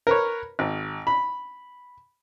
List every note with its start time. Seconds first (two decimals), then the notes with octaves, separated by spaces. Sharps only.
0.07 A#4 B4 C#5
0.59 G#1
1.07 B5